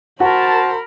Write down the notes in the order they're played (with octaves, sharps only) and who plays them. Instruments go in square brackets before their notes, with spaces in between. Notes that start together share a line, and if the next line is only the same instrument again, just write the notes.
[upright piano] F#4 [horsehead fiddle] A#4 B5 [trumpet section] C5 A5